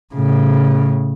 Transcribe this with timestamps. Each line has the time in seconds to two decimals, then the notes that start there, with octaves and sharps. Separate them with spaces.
0.14 A2 C#3